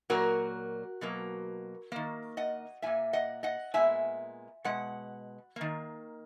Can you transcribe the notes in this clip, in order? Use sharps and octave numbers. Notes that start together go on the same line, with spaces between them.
A#2 F#3 A#3 F#4 A#4
B2 F#3 A#3
D#3 A#3
D#5 F#5
A#2 A#3 E5 G#5
D#5 F#5
D#5 F#5
A#2 G#3 B3 E5 G#5
B2 G#3 F#5
D#3 A#3